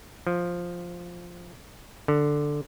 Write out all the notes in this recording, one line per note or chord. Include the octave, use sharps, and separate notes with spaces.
F3
D3